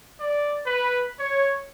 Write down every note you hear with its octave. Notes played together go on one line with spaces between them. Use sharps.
D5
B4
C#5